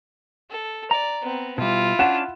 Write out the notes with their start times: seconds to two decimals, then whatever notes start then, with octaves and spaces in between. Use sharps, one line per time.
0.50 A4
0.91 D5 A#5
1.22 B3 C4
1.58 B2 G3 E4 F4
1.99 C#4 D4 F#5 E7